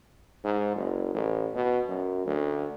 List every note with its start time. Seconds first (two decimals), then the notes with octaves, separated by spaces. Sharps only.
0.44 G#2
0.76 F#1
1.14 A1
1.55 B2
1.88 F#2
2.26 D2